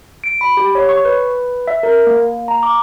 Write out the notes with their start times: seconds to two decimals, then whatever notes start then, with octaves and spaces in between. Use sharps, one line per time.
0.24 D7
0.41 B5
0.57 G4
0.75 C#5
0.89 C#6
1.05 B4
1.68 E5
1.83 A#4
2.07 A#3
2.48 A#5
2.63 D6